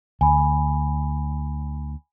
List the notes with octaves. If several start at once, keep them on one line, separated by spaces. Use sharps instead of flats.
D2 G#5 B5